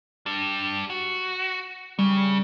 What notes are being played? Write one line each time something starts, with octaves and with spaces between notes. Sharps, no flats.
G3 D4
F#4
C#3 G3